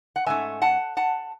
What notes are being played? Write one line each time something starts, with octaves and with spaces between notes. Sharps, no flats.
F#5
G#2 E3 A3 C#4 E5 G#5
F#5 A5
F#5 A5